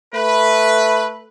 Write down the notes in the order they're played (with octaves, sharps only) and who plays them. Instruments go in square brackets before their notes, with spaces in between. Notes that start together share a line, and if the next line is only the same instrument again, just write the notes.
[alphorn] A3 [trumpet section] B4